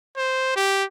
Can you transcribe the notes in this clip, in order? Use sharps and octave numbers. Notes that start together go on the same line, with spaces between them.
C5
G4